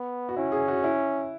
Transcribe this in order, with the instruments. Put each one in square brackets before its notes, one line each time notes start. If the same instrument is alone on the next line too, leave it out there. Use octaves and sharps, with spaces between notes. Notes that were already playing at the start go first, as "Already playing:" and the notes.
Already playing: [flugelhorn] B3
[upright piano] F#4
[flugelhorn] C#4 [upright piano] E4
[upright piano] G#4
F#4
E4